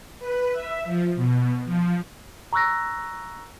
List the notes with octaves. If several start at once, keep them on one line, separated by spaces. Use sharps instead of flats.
B4
E5
F3
B2
F3
A#5 C#6 E6 F#6 A#6